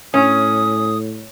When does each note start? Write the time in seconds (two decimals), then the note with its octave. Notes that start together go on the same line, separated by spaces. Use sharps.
0.14 A2 C#4 D#6